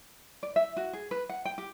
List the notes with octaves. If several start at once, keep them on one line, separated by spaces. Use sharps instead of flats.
D5
E5
F#4
G#4
B4
F#5
G5
G4